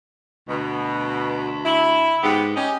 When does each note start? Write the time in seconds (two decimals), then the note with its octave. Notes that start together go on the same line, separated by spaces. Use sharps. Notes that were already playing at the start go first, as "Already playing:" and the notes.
0.49 D2 B2
1.65 E4
2.23 G#2 B3 G4
2.56 C#4 G4 D#5